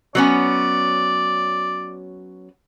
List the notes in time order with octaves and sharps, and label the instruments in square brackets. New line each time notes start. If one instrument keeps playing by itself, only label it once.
[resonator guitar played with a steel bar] F#3 B3 C#4 [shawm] D5